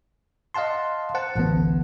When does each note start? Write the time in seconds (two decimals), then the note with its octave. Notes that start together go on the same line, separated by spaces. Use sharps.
0.54 D#5 F5 F#5 A5 C6
1.14 C5 F#5 A5
1.35 A1 D2 B3